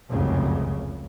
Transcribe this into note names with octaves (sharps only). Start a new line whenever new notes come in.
F1 C#2 F#2 C#3